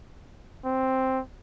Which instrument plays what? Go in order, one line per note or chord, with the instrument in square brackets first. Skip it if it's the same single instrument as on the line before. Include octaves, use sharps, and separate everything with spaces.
[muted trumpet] C4